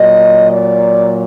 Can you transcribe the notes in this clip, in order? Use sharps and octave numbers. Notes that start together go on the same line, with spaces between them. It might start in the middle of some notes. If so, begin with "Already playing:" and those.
Already playing: A#2 F#3 D#5
D5